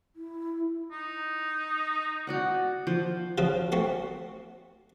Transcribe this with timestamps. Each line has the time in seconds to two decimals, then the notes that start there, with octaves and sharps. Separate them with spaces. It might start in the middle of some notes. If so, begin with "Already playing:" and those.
0.16 E4
0.91 D#4
2.27 F#4 D5 F#5
2.87 F3
3.38 C#3 F3 F#3
3.72 A3 C4 F#4